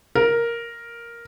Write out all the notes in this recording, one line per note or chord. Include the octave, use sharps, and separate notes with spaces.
A#4